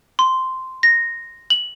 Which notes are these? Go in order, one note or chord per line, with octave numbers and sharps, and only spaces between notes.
C6
A#6
F#7